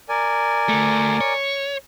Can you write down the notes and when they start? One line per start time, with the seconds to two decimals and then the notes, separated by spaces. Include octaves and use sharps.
0.09 A#4 D5 G#5
0.69 D2 A3
1.21 C#5